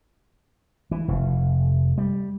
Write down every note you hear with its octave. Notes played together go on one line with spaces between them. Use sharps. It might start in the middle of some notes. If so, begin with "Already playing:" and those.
E3
F1
G3